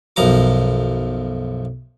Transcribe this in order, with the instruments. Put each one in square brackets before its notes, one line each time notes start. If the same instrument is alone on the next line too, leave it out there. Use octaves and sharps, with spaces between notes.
[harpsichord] B1 F#2 F3 A#5 D6